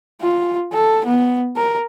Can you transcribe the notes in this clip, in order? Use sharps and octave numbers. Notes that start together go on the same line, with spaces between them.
F4
A4
B3
A#4